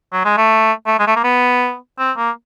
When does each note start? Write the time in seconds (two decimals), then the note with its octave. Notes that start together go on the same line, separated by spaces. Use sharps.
0.13 F#3
0.25 G#3
0.37 A3
0.86 A3
0.99 G#3
1.07 A3
1.16 A#3
1.24 B3
1.98 C4
2.17 A#3